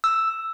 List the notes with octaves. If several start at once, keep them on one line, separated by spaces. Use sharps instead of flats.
E6